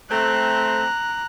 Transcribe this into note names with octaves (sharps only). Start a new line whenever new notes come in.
A3 C4 A#5 F#6